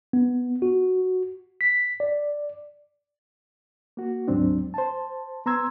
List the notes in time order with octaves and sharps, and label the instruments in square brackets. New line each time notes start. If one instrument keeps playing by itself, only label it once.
[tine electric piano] B3
F#4
B6
D5
[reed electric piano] A#3 F#4
D2 G#2 F#3 C4 D4
C5 A5
B3 A#5 C6 E6 G#6